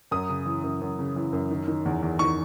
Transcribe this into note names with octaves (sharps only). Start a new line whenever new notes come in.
F#2 D#6
C#3
E3
F#2
F#2
C#3
E3
F#2
D#3
D#3
E2
E2
D#3 C#6